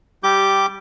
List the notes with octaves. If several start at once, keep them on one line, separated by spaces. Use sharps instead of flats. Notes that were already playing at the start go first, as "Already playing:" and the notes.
G3 G4 D6 G6